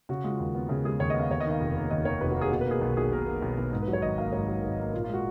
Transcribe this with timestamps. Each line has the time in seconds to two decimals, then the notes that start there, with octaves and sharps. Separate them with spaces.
0.09 C#3 F#4
0.24 G#3 F4
0.39 D#2
0.55 B3
0.69 C#3 G#4
0.84 G#3 G#4
1.00 D#2 C#5
1.10 D#5
1.14 B3 F5
1.30 D#2 C#5
1.40 D#5
1.46 D#3 F5
1.60 F1
1.76 A#3
1.90 D#2 D#5
2.05 D#3 C#5
2.21 F1 B4
2.31 F#4
2.37 A#3 G#4
2.52 B2
2.61 B4
2.67 A#3 G#4
2.81 B1 F#4
2.97 B1 G#4
3.12 B2 A#4
3.26 A#3
3.42 B1
3.58 B1
3.73 G#2
3.82 B4
3.88 F#3
3.93 C#5
4.02 G#1 D#5
4.18 A#3 F5
4.33 G#2 C#5
4.48 F#3
4.63 G#1
4.79 A#3
4.93 A#2 F4
5.04 F4
5.09 G#3 F#4